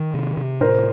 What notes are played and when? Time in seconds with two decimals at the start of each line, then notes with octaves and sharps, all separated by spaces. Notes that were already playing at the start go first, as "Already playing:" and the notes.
Already playing: D#3
0.14 C3
0.37 C3
0.60 A2 A#4 C5